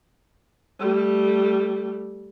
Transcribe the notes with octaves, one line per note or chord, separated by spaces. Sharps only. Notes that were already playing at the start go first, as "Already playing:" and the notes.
G3 A3